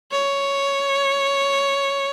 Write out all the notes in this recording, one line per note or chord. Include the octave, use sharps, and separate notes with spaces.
C#5